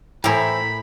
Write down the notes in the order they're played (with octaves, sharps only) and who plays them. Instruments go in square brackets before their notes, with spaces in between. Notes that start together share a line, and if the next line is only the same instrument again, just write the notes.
[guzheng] A2 A#4 [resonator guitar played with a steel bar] E3 E4 C5 [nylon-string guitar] G5 G#5 [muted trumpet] B5